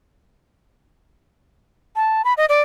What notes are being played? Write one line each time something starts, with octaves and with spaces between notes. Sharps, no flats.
A5
B5
D#5
D5